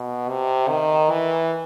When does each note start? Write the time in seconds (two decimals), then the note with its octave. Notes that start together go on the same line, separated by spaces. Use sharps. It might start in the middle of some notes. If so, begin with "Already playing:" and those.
Already playing: B2
0.29 C3
0.69 D#3
1.10 E3